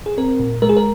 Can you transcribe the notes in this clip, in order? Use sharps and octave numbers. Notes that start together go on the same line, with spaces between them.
G#4
C4 A#4
A#2
G#3 A#4
G#4
A#4